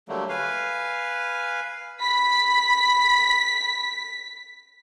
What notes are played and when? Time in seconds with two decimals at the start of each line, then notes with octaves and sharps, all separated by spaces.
0.09 D3 F#3 G3 A3 A#3
0.29 B4 F5 G#5
2.00 B5 B6